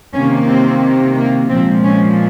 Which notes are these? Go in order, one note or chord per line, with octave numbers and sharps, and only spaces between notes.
C3 D#3 A#3 C#4
C4
A#3
A#2 F3 G#3 C4
C#4